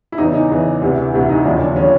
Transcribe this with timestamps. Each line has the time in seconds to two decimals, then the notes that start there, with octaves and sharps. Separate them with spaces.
0.12 E4
0.18 E2 C#3 E3 D#4
0.34 D#4
0.49 E2 C#3 E3
0.81 D2 C3 E3
1.14 D2 C3 E3
1.29 D#4
1.44 D#2 C#3 F3 D4
1.61 D4
1.76 C#3 F3 C#4